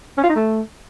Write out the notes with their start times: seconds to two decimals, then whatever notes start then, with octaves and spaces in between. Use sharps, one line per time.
0.18 C#4
0.24 F4
0.30 D#4
0.36 A3